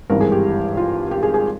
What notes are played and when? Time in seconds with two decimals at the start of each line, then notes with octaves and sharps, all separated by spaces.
0.10 G#1 G2 E3 A#4
0.21 G#4
0.32 G4
0.77 F4
1.11 G4
1.23 G#4
1.34 G#4